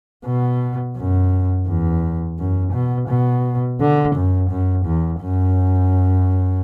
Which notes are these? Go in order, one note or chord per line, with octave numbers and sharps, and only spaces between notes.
B2
F#2
E2
F#2
B2
B2
D3
F#2
F#2
E2
F#2